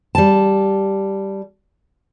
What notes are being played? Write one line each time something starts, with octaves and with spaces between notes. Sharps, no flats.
G3 A5